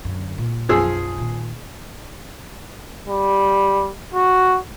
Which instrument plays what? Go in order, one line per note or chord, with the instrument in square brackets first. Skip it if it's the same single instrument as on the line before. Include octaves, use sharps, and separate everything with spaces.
[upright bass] F#2 D3
A#2
[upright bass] B1 F#2 [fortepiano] F3 G#4 E6
[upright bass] A#2 D#3
[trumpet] G3
F#4